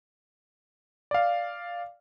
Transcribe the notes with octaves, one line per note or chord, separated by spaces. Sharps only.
D5 F5